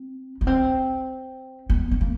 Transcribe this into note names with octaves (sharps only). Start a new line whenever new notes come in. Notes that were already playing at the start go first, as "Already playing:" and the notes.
Already playing: C4
B3
C4
B3
B3
A#3